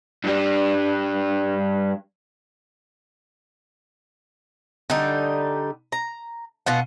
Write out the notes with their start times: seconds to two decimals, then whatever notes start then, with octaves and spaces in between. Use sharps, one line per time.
0.24 G2 G3
4.90 D3 G3 D#4
5.92 A#5
6.66 B2 F4 F#5